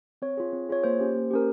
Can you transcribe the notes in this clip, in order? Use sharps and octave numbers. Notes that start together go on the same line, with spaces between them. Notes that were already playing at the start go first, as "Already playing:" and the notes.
C4 C#5
F4 G#4
C4
F4 G#4 C#5
A#3 C5
C#4 G4
A#3
C#4 G4 A#4